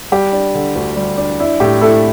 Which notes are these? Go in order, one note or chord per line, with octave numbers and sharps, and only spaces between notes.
G3 G4
D4
D3
D2
G3
D4
D4 E4
A2 G4
A3 E4 A4